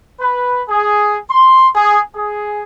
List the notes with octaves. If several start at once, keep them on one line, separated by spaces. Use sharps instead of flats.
B4
G#4
C6
G#4
G#4